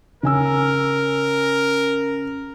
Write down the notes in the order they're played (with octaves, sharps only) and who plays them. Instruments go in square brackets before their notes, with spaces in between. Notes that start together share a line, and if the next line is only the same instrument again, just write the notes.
[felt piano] C#3 G#5 E6 [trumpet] A#4